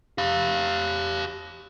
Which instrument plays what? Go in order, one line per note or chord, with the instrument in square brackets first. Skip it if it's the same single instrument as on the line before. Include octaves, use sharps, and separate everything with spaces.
[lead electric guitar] G4 F5